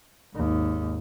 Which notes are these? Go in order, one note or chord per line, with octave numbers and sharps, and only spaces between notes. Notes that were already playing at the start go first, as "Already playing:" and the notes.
G#1 D#2